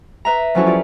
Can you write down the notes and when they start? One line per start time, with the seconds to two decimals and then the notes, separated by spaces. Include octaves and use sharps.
0.25 B4 E5 A#5
0.55 F3 F#3 C#4 E4 F#4 A4
0.66 F4 G4 D5